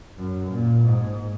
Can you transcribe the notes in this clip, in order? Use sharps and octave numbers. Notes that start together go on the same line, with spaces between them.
F#2
A#2
G#2